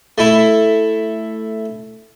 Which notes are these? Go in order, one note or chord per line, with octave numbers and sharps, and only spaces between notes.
A3 E4